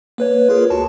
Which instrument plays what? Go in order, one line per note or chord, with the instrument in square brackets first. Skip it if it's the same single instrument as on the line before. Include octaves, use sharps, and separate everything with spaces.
[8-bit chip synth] A#3 B4 C#5
F4 G#4 A#4
C#2 F#4 A5